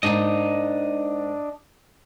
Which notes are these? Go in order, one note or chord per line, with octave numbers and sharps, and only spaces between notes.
G#2 A#3 D4 D#4 D#5